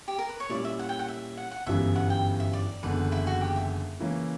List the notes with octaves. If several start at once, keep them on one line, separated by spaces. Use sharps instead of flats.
G4
A#4
B4
C#5
A#2 G3 C#4 E4 D5
E5
F#5
G5
F#5
E5
F#5
F#5
G1 F#2 E3 G3 B3 E5
F#5
G5
E5
D5
F#1 E2 D3 B4
E4
F#4
G4
E5
C#3 E3 A#3 C#4